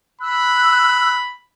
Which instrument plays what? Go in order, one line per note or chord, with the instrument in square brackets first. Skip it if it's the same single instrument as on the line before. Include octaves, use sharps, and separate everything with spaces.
[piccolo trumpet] B5 [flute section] E6 F#6